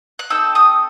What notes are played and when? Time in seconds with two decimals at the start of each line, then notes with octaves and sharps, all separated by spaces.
0.19 F#6
0.30 C4 D#4 A4 E6
0.55 D#6